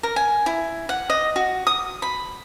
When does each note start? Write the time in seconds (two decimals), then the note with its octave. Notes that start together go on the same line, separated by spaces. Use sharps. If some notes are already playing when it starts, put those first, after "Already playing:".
0.03 A#4
0.16 G#5
0.46 E4
0.89 F#5
1.10 D#5
1.36 F#4
1.67 D#6
2.02 B5